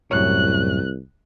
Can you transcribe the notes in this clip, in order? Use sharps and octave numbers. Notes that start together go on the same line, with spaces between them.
C2 F#2 A2 C#5 F#6